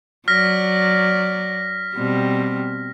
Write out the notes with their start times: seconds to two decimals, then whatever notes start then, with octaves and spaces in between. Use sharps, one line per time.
0.28 F#3 D5 F6 A#6 B6
1.96 B2 G3 C4